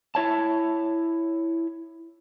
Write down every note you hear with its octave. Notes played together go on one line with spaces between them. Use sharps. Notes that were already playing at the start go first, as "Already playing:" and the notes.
E4 C#5 A5